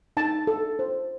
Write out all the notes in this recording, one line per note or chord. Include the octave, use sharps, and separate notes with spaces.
D#4 A5
A4
C5